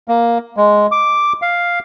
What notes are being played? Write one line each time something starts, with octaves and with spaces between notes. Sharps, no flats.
A#3
G#3
D6
F5